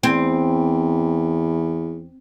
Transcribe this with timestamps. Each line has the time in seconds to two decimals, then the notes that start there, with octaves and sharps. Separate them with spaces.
0.03 E2 C4